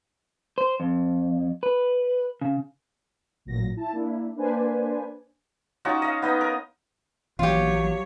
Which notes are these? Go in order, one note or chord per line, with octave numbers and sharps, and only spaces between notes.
C5
F2
B4
C#3
A1 A#2 F#3 A#6
E4 A5
A#3 D4 E4
A#3 D4 B4 C5 D5 G#5
C#4 D#4 F4 F#4
D#5 F5
B3 D#4 D#5
A#4
A#1 E3 F#3 B3 F4 G4 C#5